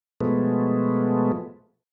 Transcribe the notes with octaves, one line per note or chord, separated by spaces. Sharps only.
B2 F3 G#3 A3 B3